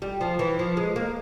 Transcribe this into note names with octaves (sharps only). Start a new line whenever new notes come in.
G3
F3
E3
F3
G#3
A#3